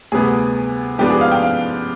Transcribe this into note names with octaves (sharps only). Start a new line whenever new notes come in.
D2 C3 G3 B3 G#4
G#2 F3 B3 D4 G4
G#4
F5
G5
F5